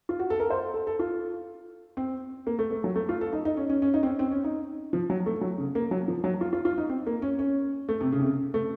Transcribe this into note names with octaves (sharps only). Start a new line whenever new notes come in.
F4
F#4
A4
A#4
C5
A4
A4
F4
C4
A#3
A3
A3
F#3
A3
F4
A4
D#4
D#4
C#4
C#4
C#4
D#4
C4
C#4
C4
C#4
D#4
F3
F#3
A3
F#3
C#3
A#3
F#3
F3
F#3
F4
F4
F4
D#4
C4
A#3
C#4
C#4
A3
C3
C#3
C3
C#3
A3